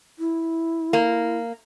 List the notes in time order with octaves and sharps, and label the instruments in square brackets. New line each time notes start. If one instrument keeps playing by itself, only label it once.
[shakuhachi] E4
[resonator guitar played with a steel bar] A#3